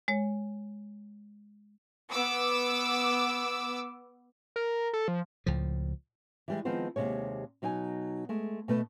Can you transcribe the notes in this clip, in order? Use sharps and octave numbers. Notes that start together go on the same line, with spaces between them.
G#3 C#5
B3 D6 E6
A#4
A4
F3
C#2 A2 F3
E3 G3 G#3
D#3 F3 G#3 B3 C4 C5
D#2 C3 G#3 C#5
B2 F#3 D#4 G5 G#5
G#3 A3
B2 A3 B4 D#5